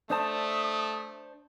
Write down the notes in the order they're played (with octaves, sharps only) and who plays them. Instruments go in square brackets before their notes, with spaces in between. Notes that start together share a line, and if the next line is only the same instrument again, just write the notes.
[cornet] A3 [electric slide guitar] D4 C5 A5 [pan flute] D#6